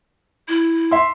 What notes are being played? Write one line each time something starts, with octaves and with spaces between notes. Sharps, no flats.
E4
E5 C6